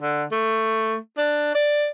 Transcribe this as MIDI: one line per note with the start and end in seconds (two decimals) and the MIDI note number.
0.01 0.25 50
0.32 0.96 57
1.18 1.55 62
1.55 1.89 74